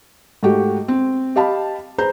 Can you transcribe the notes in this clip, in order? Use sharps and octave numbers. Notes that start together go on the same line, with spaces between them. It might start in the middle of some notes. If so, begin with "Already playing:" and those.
G#2 A3 F#4 G4
C4
G4 D#5 F5 A5 B5
G#4 B4 C5 A#5 G6